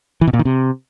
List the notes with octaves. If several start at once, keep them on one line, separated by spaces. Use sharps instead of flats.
E3
B2
A#2
D#3
C3